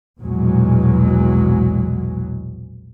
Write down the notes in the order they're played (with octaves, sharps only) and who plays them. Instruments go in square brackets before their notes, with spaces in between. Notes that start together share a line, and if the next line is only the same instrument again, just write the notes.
[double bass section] A#1 E2 B2 F#3 G#3